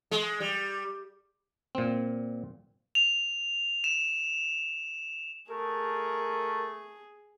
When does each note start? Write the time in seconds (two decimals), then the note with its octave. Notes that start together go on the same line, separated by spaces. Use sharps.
0.11 G#3
0.40 G3
1.75 A#2 C4
2.95 F7
3.84 E7
5.50 A3 G#4 A#4